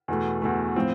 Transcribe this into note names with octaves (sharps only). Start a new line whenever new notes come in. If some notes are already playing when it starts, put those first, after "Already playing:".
E2 B2 A3
E2 B2 A3
A2 F3 C4